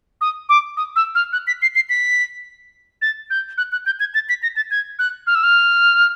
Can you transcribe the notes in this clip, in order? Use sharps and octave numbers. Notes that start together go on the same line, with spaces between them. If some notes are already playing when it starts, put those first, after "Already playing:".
D#6
D6
D#6
E6
F6
F#6
B6
C7
C7
B6
A6
G6
F#6
F#6
G6
G#6
A6
B6
A#6
A6
G#6
F#6
F6
E6
F6